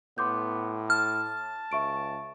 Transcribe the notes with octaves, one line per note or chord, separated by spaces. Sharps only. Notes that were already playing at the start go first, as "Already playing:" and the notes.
A2 B3 C6 D6 G6
A5 F6
C#2 E5 C#6 D7